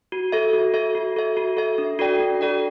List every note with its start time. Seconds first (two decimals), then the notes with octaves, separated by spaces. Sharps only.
0.12 F#4
0.32 A4 E5
0.53 F#4
0.74 A4 E5
0.95 F#4
1.16 A4 E5
1.37 F#4
1.57 A4 E5
1.78 D4
1.99 F#4 A4 D5 G5
2.20 D4
2.41 F#4 A4 D5 G5